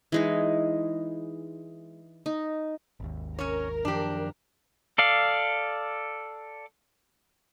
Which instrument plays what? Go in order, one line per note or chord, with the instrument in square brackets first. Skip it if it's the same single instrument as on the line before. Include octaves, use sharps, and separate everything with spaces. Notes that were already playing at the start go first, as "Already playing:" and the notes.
[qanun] E3 G#3 D#4
D#4
[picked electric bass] G#1 D#2
[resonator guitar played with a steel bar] C#4 C#5 [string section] A#4
[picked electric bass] F#2 D#3 F3 [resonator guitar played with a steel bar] D4 G4
[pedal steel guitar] A4 D5 F5